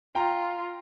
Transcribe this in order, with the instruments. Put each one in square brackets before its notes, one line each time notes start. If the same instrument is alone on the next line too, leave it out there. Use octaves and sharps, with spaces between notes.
[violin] F4 [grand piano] G5 A#5